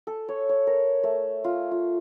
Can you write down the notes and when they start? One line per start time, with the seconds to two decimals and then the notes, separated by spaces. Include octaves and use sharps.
0.07 A4
0.28 C#5
0.49 C#5
0.67 A#4
1.03 A3
1.44 F4
1.71 F4